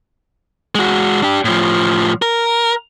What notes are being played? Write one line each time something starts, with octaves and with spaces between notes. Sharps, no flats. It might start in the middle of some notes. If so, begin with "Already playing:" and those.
G#3 F#4
D4 G4
A2 F3
A#4